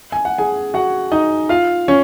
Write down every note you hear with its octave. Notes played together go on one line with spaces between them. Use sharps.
G#5
F#5
G#4 G#5
F#4 F#5
D#4 D#5
F4 F5
C#4 C#5